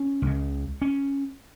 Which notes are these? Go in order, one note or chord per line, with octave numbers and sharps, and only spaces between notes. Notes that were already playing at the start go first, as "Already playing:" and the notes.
Already playing: C#4
C#2 C#3
C#4